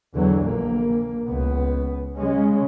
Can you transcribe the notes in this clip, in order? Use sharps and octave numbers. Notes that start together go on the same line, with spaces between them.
E2 D3 E3 F#3
A#1 A#3
C#2 B3
C#3 G#3 C#4